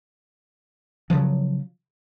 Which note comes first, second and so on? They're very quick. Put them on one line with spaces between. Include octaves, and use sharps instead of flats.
F3 C#3 F#3